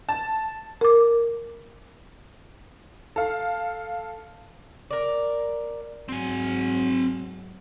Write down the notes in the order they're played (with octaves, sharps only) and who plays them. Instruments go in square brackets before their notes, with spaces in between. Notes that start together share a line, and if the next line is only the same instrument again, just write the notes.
[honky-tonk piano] A5
[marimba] A#4 D6
[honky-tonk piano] A4 F5
[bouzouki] A#4 D5
[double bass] G#2 F#3 [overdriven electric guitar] C4 G#5